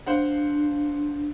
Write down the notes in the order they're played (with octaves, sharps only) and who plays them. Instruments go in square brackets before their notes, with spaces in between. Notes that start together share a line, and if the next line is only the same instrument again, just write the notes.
[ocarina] D4 [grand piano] C5 F5 F#5